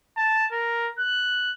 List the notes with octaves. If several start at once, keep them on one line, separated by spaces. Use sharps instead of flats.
A5
A#4
F#6